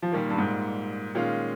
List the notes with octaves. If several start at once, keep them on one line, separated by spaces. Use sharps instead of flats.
F3
A#2 D#3 G3 A#3
G2
G#2
A#2 D#3 G#3 C#4 F4